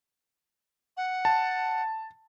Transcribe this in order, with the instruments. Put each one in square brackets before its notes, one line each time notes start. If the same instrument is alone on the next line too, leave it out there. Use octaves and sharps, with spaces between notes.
[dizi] F#5
[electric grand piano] A5